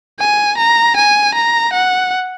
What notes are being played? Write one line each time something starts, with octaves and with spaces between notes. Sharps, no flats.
G#5
A#5
G#5
A#5
F#5